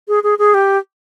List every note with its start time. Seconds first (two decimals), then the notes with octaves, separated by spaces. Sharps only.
0.08 G#4
0.23 G#4
0.39 G#4
0.54 G4